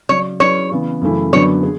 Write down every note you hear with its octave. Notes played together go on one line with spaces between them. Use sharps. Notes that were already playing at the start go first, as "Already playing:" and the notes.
C#3 F#3 C#4 C#5
F#3 C#4 E4 G#4 B4 C#5
C#3 E3 B3
F#2 C#3 E3 A3 E4
F#2 D3 F#3 B3 D4 C#5
G#4